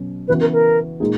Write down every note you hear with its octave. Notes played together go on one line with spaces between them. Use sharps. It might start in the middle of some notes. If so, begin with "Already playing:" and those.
Already playing: B2 F#3 C#4
C#3 E3 B3 F#4 B4
A#4
A#4
A#2 G#3 D#4 G#4